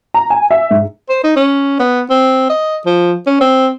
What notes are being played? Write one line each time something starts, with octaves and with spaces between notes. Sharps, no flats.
A#5
G#5
E5
G#2
C5
D#4
C#4
B3
C4
D#5
F3
C#4
C4